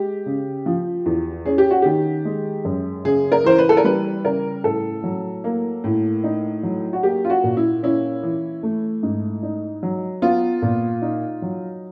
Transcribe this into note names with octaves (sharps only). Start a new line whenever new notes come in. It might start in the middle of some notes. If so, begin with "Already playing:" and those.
Already playing: G#3 G4
C#3
F3
E2
C#4 G#4
G4
F#4
D#3 G4
G#3
F#2
C#3 G#4
A#4
E3 C5
B4
A4
A#4
G3 B4
C#3 A#4
A2 A4
F#3
A#3
A2
D#4
F#3
F#4
A#3 G4
F4
F#4
A#2
E4
C#4 E4
E3
A3
G#2
D#4
F#3
B3 F4
A#2
D#4
F#3